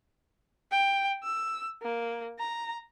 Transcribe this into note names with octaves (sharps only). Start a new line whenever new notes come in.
G5
E6
A#3
A#5